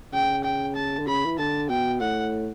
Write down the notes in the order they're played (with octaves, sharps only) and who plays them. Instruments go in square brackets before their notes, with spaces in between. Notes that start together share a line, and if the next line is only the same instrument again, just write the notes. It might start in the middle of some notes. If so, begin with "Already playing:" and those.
[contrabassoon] C#3 [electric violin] G5
[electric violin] G5
A5
[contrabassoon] D3
[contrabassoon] C#3 [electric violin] B5
[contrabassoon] E3
[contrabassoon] D3 [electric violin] A5
[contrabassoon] B2 [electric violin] G5
[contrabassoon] A2 [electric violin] F#5